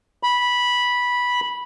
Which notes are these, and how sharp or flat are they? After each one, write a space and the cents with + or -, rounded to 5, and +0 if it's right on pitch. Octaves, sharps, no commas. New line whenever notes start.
B5 -10